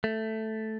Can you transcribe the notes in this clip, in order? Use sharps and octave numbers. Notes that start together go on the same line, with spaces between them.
A3